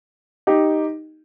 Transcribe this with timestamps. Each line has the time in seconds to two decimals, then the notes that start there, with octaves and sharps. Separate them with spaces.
0.47 D#4 G4